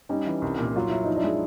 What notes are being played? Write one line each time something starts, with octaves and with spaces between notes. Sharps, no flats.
G3 C#4 D#4
E3
C2
A#2
F#3 F4
F#3 E4
F3 D#4
D4 E4
G#3